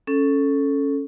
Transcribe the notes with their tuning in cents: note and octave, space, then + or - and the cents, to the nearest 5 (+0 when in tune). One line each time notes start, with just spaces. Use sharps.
C#4 +0 A4 +0